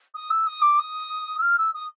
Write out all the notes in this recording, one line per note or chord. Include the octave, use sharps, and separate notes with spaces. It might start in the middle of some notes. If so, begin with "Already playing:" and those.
D#6
E6
D#6
D6
D#6
E6
F6
E6
D#6